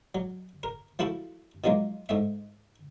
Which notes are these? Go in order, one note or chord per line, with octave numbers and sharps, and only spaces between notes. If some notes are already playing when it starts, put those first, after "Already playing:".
F#3
A#4
F3 A3 E4 F#4 A4
D#3 F3 F#3 G#3 A#3
G#2 A3 E5